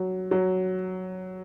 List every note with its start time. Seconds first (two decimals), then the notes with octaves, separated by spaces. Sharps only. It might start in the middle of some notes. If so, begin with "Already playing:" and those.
Already playing: F#3
0.31 F#3